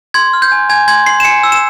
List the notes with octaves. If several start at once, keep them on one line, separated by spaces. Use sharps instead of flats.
C6 G#6
F6
G6
G#5
G#5 G#6
C6 G#6
C6 C7
E7
G#5 C#7
E6
E7